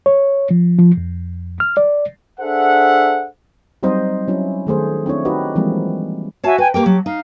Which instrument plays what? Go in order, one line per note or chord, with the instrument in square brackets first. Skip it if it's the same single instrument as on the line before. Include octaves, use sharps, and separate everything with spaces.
[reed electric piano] C#5
F3
F3
F2
F6
D5
[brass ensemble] D4 G#4 A4 C5 E5 F#5
[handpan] F#3 G3 C4 D#4 C5 D#5
F#3 C#4 E4
D#3 A3 G#4 C5
C4 D4 E4 C#5
D#4 F#4 G4 B4 D#5
E3 F3 G3 G#3 A#3 C4
[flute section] F#4 E5 G#5 [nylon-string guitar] C#5 F5 A5
[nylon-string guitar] B4 [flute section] G5 G#5
[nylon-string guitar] A#3 A#4 G5 [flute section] G4 D6
[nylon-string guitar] F#3
[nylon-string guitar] D#4 [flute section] F5